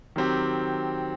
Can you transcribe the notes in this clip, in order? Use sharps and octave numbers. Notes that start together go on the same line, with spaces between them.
D#3 F#3 C4 G4